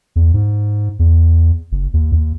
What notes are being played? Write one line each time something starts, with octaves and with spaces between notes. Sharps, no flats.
E2
G#2
E2
F#1
D#2
D#2